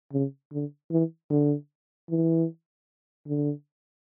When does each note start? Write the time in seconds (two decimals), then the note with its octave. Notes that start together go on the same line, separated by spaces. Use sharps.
0.13 C#3
0.52 D3
0.91 E3
1.30 D3
2.09 E3
3.27 D3